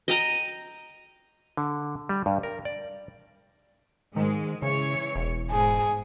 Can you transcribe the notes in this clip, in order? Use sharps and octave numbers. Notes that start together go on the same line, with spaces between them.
D#5 G5 A#5
D3
G3
G2
A#4
D5
G#2 D#3 G#3
C#3 E3 C#5
E1
G#2 G#4